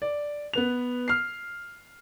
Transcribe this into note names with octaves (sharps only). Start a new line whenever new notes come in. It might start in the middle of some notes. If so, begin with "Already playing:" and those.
D5
B3 B4 F7
F6 C7